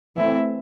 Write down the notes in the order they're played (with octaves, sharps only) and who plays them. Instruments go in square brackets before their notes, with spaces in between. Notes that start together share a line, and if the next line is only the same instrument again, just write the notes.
[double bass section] E3 A3 C4 [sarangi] E4